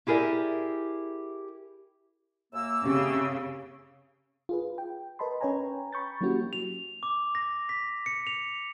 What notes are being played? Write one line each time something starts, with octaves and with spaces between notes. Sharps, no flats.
E4 G4 G#4 A#4 D5 E5
F#2 A#3 E6
C#3 C4 C#4 G4
F4 G#4 B4
G5
A#4 B4 D#5 A5 B5 C6
C#4 B4 C#5 G5 G#5 A#5
B5 C#6 G6 A6
F#3 A#3 C#4 E4 F#4 G4
F7
D6
A#6
B6
C#7
F7